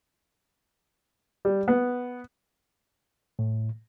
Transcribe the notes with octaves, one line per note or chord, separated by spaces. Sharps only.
G3
B3
A2